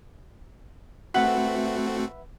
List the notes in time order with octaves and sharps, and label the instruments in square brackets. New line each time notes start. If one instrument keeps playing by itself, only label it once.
[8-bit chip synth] A3 C4 F#4 [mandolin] B4 E5 F#5